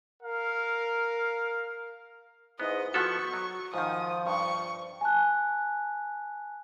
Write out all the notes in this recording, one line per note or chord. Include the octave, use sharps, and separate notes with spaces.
A#4 F5
E2 G#2 B3 D#5
F3 B3 F#4 A4 C#6
F#3
G#2 D#3 F3 D#6
G2 C#6
G#5 A5 F#6